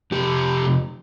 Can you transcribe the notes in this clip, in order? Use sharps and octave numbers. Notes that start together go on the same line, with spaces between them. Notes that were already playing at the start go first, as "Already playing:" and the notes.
F2 C3 G4